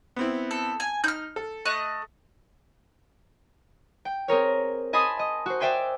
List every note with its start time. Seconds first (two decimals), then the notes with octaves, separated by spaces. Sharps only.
0.16 B3 C4 E4
0.51 A4
0.80 G#5
1.04 D#4 F6 G6
1.36 A4
1.65 A3 D#5 F#6
4.05 G5
4.28 C4 G#4 A#4 C#5
4.93 D#5 G#5 A5 B5 C6 D#6
5.19 D#5
5.46 F#4 C5
5.60 C5 D5 E5 G5 G#5 C6